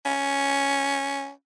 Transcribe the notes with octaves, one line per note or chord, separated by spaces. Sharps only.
C#4